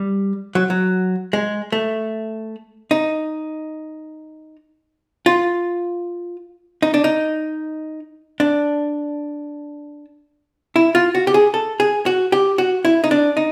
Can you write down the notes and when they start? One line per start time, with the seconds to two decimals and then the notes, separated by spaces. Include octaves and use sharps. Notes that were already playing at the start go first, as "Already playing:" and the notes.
Already playing: G3
0.55 F#3
0.70 F#3
1.33 G#3
1.72 A3
2.91 D#4
5.26 F4
6.82 D#4
6.94 D4
7.04 D#4
8.40 D4
10.76 E4
10.95 F4
11.15 F#4
11.27 G4
11.34 G#4
11.54 A4
11.80 G#4
12.06 F#4
12.32 G4
12.58 F#4
12.85 E4
13.04 D#4
13.11 D4
13.37 D#4